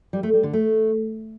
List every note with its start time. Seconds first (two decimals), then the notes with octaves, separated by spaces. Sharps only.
0.13 G3
0.23 A3
0.33 G3
0.43 D3
0.53 A3